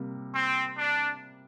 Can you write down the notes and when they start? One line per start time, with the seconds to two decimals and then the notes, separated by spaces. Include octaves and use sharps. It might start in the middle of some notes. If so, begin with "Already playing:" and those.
Already playing: C3 G3 A#3
0.34 C4
0.78 D4